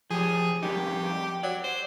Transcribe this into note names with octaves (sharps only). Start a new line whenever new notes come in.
F3 G4 G#4
F2 G3 D#4 G4
F#3 D5
C5